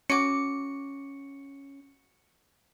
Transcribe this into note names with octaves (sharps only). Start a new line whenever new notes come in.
C#4 F#4 D6 C#7